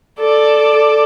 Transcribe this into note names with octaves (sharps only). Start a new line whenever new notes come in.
A4 D5